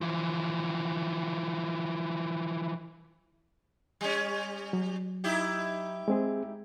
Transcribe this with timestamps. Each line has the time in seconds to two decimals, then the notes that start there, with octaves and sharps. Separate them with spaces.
0.01 E3 F3
4.01 G3 C#4
4.73 F#3
5.24 D#4 E4 G4
6.08 G#3 C4 G#4